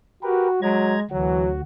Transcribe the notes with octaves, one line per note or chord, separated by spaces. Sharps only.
F#4 G4 A#4 B4
F#3 G#3 A#5 G#6
D2 E3 F#3 F#4